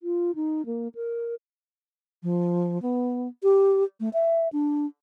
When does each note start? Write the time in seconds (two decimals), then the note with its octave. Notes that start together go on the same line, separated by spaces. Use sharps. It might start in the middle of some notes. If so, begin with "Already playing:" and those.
0.03 F4
0.35 D#4
0.66 A#3
0.95 A#4
2.23 F3
2.82 B3
3.43 G4
4.00 A3
4.14 E5
4.52 D4